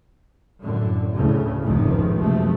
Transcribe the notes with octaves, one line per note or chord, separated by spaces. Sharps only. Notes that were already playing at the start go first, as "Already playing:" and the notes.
F#2 A2 D3
D2 A2 C#3
F1 C#2 G#2 D#3 F3 A3
F#1 C3 F3 G#3 A3